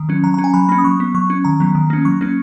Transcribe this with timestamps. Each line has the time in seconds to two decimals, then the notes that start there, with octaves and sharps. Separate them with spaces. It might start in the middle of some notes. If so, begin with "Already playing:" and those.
Already playing: D#3
0.09 F#3 C#4
0.23 F#3 A#5
0.34 A#5
0.38 C#4
0.44 G#5
0.54 F#3 B5
0.69 A#3 C#4 B5
0.78 D#6
0.84 F#3 C#6
1.00 B3
1.14 F#3 C#6
1.30 C#4
1.45 D#3 A#5
1.60 F#3 B3
1.75 D#3
1.90 A#3 C#4
2.05 F#3 C#6
2.21 A#3 C#4